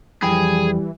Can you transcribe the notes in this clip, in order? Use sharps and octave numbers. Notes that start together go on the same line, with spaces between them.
F2 E3 G3 G#4 G5 B5